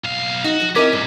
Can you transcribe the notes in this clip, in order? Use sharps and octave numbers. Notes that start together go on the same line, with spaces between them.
B1 F5
D#4 F#4
G#2 F3
C4 C#4 E4 A#4 D#5 D6 B6
D2 G2 C3